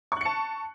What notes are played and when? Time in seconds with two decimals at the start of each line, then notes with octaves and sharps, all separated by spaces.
0.12 C#6
0.16 F#6
0.21 C#7
0.25 A5